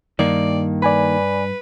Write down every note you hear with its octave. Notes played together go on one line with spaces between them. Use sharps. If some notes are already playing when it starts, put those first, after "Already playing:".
G2 D#3 A#3 D5
B4 D5 G#5 B5